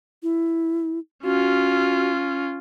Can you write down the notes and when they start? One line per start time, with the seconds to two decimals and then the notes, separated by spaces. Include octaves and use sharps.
0.23 E4
1.24 C#4 F4 F#4